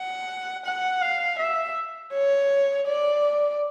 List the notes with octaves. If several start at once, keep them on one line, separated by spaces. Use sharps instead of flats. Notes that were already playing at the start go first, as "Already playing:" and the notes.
Already playing: F#5
F#5
F5
E5
C#5
D5